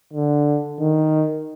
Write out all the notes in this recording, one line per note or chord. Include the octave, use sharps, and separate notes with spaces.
D3
D#3